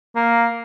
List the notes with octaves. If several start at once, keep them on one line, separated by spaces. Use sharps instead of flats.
A#3